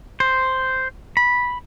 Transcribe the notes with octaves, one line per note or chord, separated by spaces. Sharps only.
C5
B5